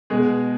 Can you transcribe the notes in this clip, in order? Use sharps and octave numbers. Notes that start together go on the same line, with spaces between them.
B2 G#3 G#4